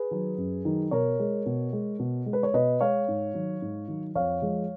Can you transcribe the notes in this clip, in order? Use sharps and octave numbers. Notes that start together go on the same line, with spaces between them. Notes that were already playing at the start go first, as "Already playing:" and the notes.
Already playing: G#4 B4
D#3 F#3
F#2
D#3 F#3
B2 A#4 C#5
G#3
B2
G#3
B2
G#3
B4
C#5
B2 B4 D#5
G#3 C#5 F5
G#2
D#3 F#3
G#2
D#3 F#3
F2 C#5 F5
F3 G#3